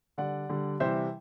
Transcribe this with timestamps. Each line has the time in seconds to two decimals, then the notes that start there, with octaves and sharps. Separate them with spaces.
0.18 D3 G3 D5 F#5
0.49 D3 G3
0.80 C3 E3 G3 C5 E5